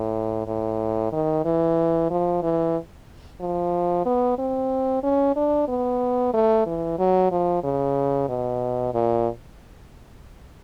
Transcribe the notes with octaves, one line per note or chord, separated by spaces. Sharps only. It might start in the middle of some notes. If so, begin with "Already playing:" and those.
Already playing: A2
A2
D#3
E3
F3
E3
F3
B3
C4
C#4
D4
B3
A3
E3
F#3
F3
C#3
B2
A#2